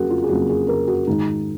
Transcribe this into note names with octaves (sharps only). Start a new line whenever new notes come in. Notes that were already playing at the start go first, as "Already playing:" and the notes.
Already playing: F2 C#3 F#3 A#3 F#4 G#4 A#4
F4
G#4
F2 C#3 F#3 A#3 F#4
G#4
A#4
F#4
G#2 D#3 G#3 D#4